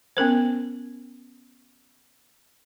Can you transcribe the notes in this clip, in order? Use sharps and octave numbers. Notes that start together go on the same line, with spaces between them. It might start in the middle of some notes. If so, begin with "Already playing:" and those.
B3 C#4 A#4 C5